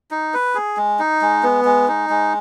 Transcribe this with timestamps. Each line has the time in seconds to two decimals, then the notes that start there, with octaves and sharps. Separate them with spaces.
0.11 D#4
0.34 B4
0.55 G#4
0.77 G#3
0.99 D#4
1.22 G#3
1.43 B3
1.65 G#3
1.88 D#4
2.10 G#3